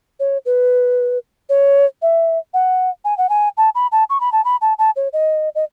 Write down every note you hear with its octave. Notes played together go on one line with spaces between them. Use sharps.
C#5
B4
C#5
E5
F#5
G#5
F#5
G#5
A5
B5
A5
C#6
B5
A5
B5
A5
A5
C#5
D#5
D#5